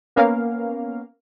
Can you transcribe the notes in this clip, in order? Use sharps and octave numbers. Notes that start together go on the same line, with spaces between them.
A#3 B3 C#4 A#4 F5